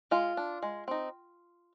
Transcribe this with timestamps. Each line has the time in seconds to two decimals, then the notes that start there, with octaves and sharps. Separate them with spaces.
0.11 G#3 F4
0.37 D4
0.63 G#3
0.88 C4 D#4